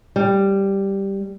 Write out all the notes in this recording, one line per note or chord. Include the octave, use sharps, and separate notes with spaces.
G3